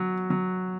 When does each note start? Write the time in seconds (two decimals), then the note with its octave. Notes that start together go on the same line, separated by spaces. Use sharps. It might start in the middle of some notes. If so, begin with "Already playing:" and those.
Already playing: F#3 F#4
0.30 F#3